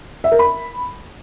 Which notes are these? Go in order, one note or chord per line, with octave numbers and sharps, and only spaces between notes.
E5
A#4
B5